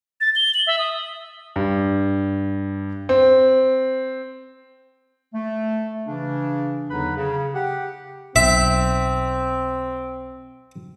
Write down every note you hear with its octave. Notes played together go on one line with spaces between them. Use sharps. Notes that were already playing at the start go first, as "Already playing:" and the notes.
A6
G7
F#7
E5
D#6
G2
C4
A3
C#3 E3 D4
E2 D3 F#3 D#4 B4 B5
C#3
G4 F#5
B1 C4 E5